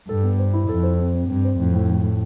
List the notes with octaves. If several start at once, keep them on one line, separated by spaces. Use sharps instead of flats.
G2 A4
B3
C5
E4
F2 A4
C5
C4
C4
G2 C4
C5
F2 A2
A2
A2
A2